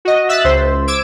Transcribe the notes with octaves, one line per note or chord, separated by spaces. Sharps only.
F#4 D#5
E5 E6 F#6 A6 B6
C#2 C5
D6 E6 G#6 D7